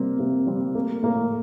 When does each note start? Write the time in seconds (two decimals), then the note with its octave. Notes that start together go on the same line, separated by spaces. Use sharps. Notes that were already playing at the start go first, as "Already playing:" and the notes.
Already playing: C3 G3 A#3 C4
0.19 C3 A#3
0.47 G3 C4
0.75 A3 A#3
1.03 A2 A#3